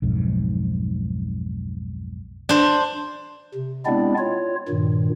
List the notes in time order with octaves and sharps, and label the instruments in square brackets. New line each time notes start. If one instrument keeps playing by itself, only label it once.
[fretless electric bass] B1 F2 G#2
[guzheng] D4 C5
[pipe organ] C3
G#3 B3 C4 D4 E4 D5
F4 C#5
G2 A#2 D#3